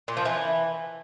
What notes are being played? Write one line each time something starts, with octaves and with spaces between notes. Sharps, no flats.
A#2
F3
E3